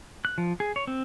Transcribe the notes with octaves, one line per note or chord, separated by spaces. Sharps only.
F#6
F3
G#4
C#5
C4